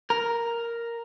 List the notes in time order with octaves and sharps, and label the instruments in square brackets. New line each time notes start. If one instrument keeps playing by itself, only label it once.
[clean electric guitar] A#4